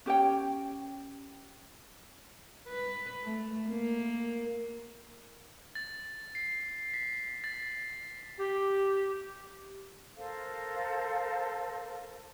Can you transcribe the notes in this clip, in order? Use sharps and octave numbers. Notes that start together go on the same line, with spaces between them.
C#4 G4 C#5 G5
B4
A3
A#3
A6
C7
B6
A6
G4
A4 A#4 C5 F5